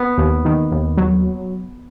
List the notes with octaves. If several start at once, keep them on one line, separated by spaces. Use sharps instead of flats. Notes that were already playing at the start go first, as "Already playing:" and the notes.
Already playing: B3
D#2
D#3
D#2
F#3